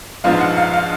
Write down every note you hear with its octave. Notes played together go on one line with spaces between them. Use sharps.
A#1 G#2 F3 G#3 B3 F5
F#5
F5
F5